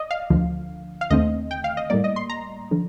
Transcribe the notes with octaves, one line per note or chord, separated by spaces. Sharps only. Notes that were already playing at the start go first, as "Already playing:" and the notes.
Already playing: D5 D#5
F5
D2 D3 F3
F5
D#2 D3 A3 C4 D#5
G5
F5
D#5
A2 G3 A#3 D5
D#5
C6
A#5
D3 F3